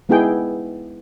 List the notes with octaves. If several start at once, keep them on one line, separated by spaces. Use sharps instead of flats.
G#3 B3 D#4 E4 G#4 G5